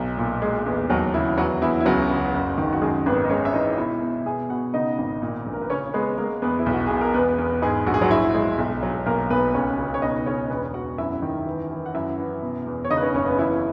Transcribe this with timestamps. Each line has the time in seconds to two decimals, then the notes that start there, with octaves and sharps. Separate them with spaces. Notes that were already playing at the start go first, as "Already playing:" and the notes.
Already playing: B1 F#3
0.17 A#2
0.42 G#3
0.66 E2
0.90 D#2 F#3 F#4
1.14 C#3 E4
1.38 E2 F#3 F#4
1.61 E2 E4
1.81 E4
1.85 C#2 F#3 F#4
2.10 C#3
2.34 F#1
2.58 D#3
2.73 F#4
2.82 F#2 G#3 G#4
3.06 G#1 B3 B4
3.24 D#5
3.30 G#3 C#4 C#5
3.45 E5
3.53 E3 D#4 D#5
3.78 B2 E4 E5
4.02 B2
4.26 B2 G#4 G#5
4.50 B2 F#4 F#5
4.73 C#3 D#4 D#5
4.98 G#1
5.22 A#2
5.46 A#1
5.53 A#4
5.62 B4
5.70 C#3 C#4 C#5
5.94 G#3 B3 B4
6.18 G#3 A#3 A#4
6.42 E2 B3 B4
6.59 E4
6.66 B1
6.73 F#4
6.87 B2 G#4
7.01 A#4
7.14 E2 B3 B4
7.38 E2
7.62 G#2 G#3 G#4
7.87 A#1 F#4
7.94 G#4
8.02 F#3 F#4
8.10 A#1 E4
8.35 G#3
8.58 B1
8.83 F#3
9.06 B1 A#3 A#4
9.30 B1 B3 B4
9.54 C#2 C#4 C#5
9.78 C#3
9.94 C#5
10.02 B2 D#4 D#5
10.26 C#2 C#4 C#5
10.50 E1 B3 B4
10.74 E1 F#4 F#5
10.98 F#2 E4 E5
11.22 D#3
11.47 E3
11.71 E3
11.86 F#5
11.94 F#2 E4 E5
12.18 E3
12.42 B2
12.66 E2
12.85 C#5
12.90 C#3 D#4 D#5
12.97 B4
13.03 C#4 C#5
13.14 F#1 C#4 C#5
13.26 B3 B4
13.39 E3 E4